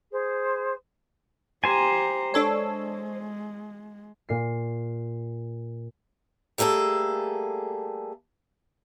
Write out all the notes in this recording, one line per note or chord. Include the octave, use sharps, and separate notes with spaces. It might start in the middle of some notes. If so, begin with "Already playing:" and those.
G#4 C5
G4 C5 G#5 A#5
G#3 D4 A4 C#5
A#2 C7
G3 A3 A#3 G#4 A4